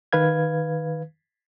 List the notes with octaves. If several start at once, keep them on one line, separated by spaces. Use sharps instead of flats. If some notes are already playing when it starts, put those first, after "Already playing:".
D#3 B4 F5 G#6